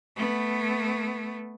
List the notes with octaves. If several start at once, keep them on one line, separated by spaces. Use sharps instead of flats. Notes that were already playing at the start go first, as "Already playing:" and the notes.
A3 B3